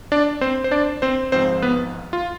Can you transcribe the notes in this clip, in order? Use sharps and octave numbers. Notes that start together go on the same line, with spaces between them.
D4 D5
C4 C5
C5
D4 D5
C4 C5
G#1 G#2 F3 C4 C5
B3 B4
F4